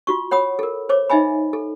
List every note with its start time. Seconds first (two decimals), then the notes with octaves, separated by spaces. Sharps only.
0.07 F4 F#4 C#6
0.31 C#5 F#5 B5 D#6
0.59 A4 A#4
0.89 C5 C#5 D6
1.10 D#4 D#5 E5 G#5 B5
1.53 A4